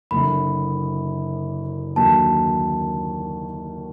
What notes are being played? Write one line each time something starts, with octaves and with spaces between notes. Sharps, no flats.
F#1 F#2 D3 B5
D#2 D3 F#3 A#3 A5